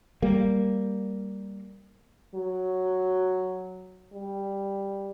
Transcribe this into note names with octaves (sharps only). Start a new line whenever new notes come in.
G3 A#3
F#3
G3